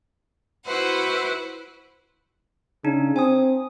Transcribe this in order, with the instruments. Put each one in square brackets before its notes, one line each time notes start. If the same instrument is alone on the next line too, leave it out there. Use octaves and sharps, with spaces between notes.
[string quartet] E4 F#4 B4 C5 F#5
[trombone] C#3 [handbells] D4 D#4
[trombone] C4 [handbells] G#5 D#6